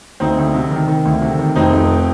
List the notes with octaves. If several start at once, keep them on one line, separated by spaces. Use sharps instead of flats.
D2 C4 D#4
D2
C3
D#3
D#3
D2
C3
D#3
F1 C4 D#4
F1